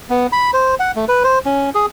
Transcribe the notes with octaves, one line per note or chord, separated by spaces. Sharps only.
B3
B5
C5
F#5
A3
B4
C5
C#4
G#4